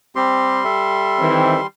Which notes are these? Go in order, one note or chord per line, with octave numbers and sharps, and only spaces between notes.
G3 C4 G4 C6
A4 E5
D#3 E3 C4